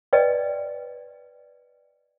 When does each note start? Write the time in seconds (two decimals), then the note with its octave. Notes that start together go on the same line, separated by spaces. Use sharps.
0.13 B4 D5 D#5 G5